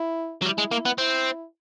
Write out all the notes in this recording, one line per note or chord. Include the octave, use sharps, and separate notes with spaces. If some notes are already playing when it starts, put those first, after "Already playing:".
Already playing: E4
F#3
G3 E4
G#3
A#3
B3
C4 E4